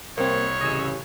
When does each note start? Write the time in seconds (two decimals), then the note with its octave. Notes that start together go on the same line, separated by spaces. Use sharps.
0.18 C2 A#3 C4 C#5
0.61 A1 C#3 D#5 G#5 E6